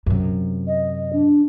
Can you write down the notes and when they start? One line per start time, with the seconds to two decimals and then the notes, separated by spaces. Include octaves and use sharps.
0.06 F#2 C3
0.67 D#5
1.13 D4